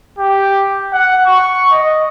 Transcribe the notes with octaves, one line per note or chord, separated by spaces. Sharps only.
G4
F#5
C#6
D#5